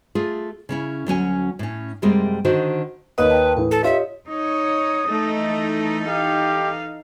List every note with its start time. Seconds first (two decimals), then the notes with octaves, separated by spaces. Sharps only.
0.15 A3 F4 G#4
0.69 C#3 C#4 E4
1.07 D2 F#3 C#4 G#5
1.59 A2 C#4
2.02 F#2 C3 G3 G#3 A#3 C4
2.45 D3 D#3 D#4 F#4 C5
3.18 D#2 A#3 B4 C#5 D#5 D#6
3.30 G5 A5
3.57 A2 E3 B4
3.71 A4
3.84 F4 G4 C#5 D#5 E5
4.28 D#4 C#5 D#6
5.10 E3 A3 D#4 A4
6.09 G4 F5